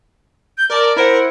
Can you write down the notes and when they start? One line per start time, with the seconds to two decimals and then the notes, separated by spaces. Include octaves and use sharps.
0.58 G6
0.70 A#4 D5 A5
0.96 E4 A#4 C5 F#5